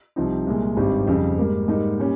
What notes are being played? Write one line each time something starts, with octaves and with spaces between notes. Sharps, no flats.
C2 C3 F3 C4 D#4
C2 A#2 G#3
G#1 G2 G3 C4 D#4
F2 C#3 G3
G#2 G3 A#3
G#2 G3 A#3 D#4
A#2 G3 C#4